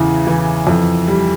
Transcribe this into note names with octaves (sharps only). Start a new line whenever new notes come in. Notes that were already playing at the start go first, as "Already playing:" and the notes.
Already playing: E2 C#3 E3
E3
F2
G3